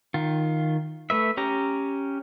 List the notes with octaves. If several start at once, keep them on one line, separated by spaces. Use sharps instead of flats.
D#3 F4
A3 B4 E5
C#4 G4 A#5